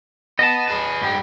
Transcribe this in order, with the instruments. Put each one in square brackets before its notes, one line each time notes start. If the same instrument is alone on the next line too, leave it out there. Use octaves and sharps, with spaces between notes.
[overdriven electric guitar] B3 [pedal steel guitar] D#5 A5
[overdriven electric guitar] G#4 B4
G#2 G3